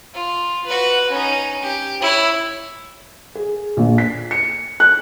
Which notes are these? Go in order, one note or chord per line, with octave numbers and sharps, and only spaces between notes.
F4
F#4 B4
C#4 D#4
G4
E4 C#5
G#4
A#1
B6
C#7
F#6